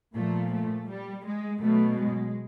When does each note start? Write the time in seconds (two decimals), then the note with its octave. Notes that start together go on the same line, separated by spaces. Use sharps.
0.16 A#2 F3 A3
0.53 A3
0.89 G3
1.25 G#3
1.61 B2 F#3 A3
1.98 G#3